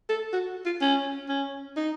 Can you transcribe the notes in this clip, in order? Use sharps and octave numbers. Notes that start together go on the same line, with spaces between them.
A4
F#4
F4
C#4
C#4
D#4